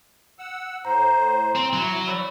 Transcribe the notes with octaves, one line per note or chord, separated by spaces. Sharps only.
F#5 E6
A2 C5 A#5
C4
F#3 E4
C#5 D5 B5 E6